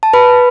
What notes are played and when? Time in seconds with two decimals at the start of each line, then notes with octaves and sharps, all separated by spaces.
0.03 A5
0.13 B4 B5